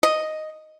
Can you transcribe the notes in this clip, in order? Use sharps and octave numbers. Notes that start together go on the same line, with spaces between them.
D#5